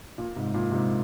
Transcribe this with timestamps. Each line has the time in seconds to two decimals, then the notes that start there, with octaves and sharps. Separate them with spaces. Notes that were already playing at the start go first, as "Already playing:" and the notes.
0.18 A#2
0.36 G#2 C3
0.54 A#2
0.72 G#2 C3